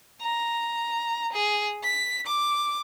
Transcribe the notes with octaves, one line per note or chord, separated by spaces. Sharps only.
A#5
G#4
B6
D6